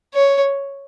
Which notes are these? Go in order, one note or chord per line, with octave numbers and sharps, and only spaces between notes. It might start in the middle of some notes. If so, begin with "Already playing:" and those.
C#5